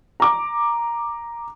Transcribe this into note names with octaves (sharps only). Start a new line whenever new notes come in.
A#5 D6